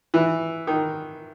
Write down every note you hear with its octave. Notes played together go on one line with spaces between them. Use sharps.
E3
D#3